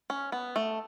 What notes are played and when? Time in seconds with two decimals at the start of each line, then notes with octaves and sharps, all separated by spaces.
0.10 C#4
0.32 B3
0.56 A3